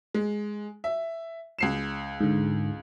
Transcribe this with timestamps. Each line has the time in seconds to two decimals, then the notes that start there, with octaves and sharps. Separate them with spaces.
0.14 G#3
0.84 E5
1.59 C#2 C7 E7
2.20 G#2 D3